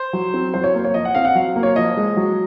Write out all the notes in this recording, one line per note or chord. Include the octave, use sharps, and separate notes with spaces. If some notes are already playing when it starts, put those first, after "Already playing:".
Already playing: C5
F#3
C4
F#3 C5
C#5
A#3
C#5
F3 D#5
F#5
C4 F5
F#5
F#3 F5
A#3
C#5
F3 D#5
G#3
F#3